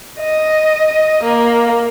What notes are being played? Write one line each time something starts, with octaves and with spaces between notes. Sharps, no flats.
D#5
A#3